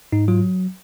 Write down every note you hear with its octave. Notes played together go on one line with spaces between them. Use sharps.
G#2 D#4
F#3 F4